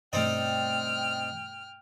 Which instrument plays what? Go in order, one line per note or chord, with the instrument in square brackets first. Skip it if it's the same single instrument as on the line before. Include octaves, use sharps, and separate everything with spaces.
[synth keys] G2 B2 A3 [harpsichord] C4 D#4 D5 [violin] G5 F6